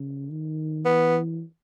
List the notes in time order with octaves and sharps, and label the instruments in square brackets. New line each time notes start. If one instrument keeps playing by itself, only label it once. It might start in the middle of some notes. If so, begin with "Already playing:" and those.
Already playing: [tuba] C#3
D#3
[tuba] E3 [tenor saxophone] B3